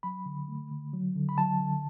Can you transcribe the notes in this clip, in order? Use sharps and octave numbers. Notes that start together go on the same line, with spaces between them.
F#3 B5
D3
A3
D3
F#3
D3
B5
F#3 A5
D3